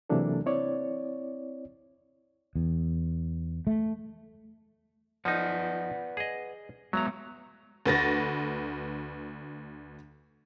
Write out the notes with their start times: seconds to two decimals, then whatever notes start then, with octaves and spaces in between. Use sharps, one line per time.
0.10 C3 E3 F#3 A#3 D4 A4
0.46 C4 E4 C#5 D5
2.55 E2
3.67 A3
5.25 F3 D#4 B4 D5 F#5
6.17 G#4 D#5
6.93 F#3 G#3 B3 E5 A#5
7.86 D2 B4 A6 A#6